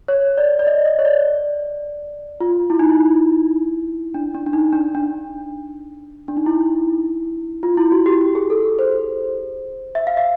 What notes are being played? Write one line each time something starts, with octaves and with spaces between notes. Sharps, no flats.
C#5
D5
D5
D#5
D#5
C#5
D5
F4
E4
D#4
E4
D4
D4
D4
D#4
D4
D4
D4
D#4
E4
F4
E4
F#4
G4
G4
G#4
A4
C5
E5
F5
E5